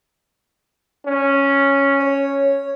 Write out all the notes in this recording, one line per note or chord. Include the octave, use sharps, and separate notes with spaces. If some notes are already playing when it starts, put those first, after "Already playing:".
C#4
C#5